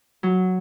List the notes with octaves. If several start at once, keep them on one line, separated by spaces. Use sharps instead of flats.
F#3